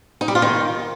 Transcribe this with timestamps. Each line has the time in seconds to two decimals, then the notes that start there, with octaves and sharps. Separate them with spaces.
0.21 D#4
0.28 G3
0.35 F4
0.42 D#3